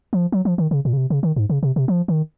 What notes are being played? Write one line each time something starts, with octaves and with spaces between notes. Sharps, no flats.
F3
F#3
F3
D#3
C#3
A#2
C#3
C3
C#3
D#3
G#2
C#3
C3
C3
F3
D#3